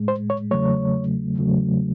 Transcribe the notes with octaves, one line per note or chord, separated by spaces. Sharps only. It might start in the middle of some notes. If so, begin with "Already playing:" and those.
Already playing: A2 G#3
C5
C#5
E2 C#3 F#3 A3 C#5
E2 C#3 F#3 A3